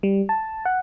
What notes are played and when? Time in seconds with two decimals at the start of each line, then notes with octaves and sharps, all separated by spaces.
0.03 G3
0.29 A5
0.65 F#5